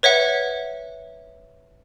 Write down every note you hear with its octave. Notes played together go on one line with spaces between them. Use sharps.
B4 C#5 E5 F#5